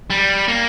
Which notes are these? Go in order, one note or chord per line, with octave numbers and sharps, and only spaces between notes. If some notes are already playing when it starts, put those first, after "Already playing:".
G3
A#3